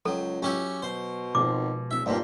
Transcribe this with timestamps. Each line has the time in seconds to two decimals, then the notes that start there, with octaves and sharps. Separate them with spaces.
0.05 C#2 F#3 A4 G5
0.43 F#3 C#4 E4 G4 C#6
0.82 B2 C5
1.35 G#1 B2 F3 G#3 D6
1.91 D1 E5
2.06 G#1 G2 A#2 C#5 D5